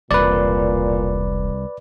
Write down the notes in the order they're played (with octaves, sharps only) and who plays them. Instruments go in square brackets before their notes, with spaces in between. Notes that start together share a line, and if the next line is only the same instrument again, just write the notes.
[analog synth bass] E1 [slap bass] C2 [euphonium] A#2 [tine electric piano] B4 D5